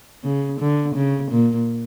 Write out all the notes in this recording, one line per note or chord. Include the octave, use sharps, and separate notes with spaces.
C#3
D3
C#3
A#2